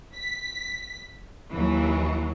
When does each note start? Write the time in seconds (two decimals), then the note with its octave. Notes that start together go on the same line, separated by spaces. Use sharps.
0.15 B6
1.51 D#2 E3 F#3